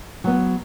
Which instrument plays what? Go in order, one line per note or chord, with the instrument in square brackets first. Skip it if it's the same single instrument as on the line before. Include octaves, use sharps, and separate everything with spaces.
[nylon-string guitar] F#3 B3